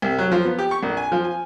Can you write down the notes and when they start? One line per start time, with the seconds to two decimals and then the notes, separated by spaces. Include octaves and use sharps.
0.02 C2
0.18 F#3
0.31 F3
0.45 B3
0.58 G4
0.71 C#6
0.83 A#1
0.97 G#5
1.12 F3
1.24 G#5